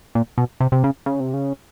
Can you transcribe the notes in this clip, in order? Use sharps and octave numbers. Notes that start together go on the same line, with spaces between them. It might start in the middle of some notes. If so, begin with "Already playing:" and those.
A#2
B2
C3
C3
C#3
C#3
C3
C#3